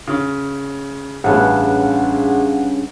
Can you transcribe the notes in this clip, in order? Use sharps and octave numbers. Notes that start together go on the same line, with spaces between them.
C#3
A1 G2 C#3 B3 G#4 F5 F#5